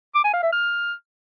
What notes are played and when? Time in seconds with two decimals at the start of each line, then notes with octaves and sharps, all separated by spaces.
0.14 D6
0.24 G#5
0.33 F5
0.43 E5
0.52 F6